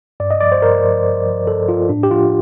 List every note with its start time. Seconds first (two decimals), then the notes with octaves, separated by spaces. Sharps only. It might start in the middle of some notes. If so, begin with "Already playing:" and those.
0.20 G2 D5
0.31 D#5
0.41 F3 D5
0.52 C5
0.62 G2 A#4
0.84 F3
1.05 G2
1.26 F3
1.47 G2 A4
1.68 F3 F4
1.89 A2 D4
2.03 G4
2.11 F3 F4